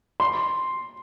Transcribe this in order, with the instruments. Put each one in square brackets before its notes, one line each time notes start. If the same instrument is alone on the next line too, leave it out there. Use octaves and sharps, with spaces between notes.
[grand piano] C6